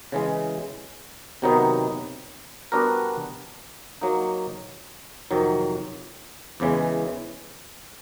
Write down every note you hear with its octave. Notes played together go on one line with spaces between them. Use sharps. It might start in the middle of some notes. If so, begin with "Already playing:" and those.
C#3 E3 G#3
C3 D#3 F#3 B3 D#4
G3 B3 D4 F#4 A#4
F#3 A#3 D#4
F2 C3 D#3 F#3
E2 C#3 E3 G#3